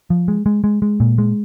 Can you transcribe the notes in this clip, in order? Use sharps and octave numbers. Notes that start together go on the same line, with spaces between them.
F3
G#3
G#3
G#3
G#3
A#2
G#3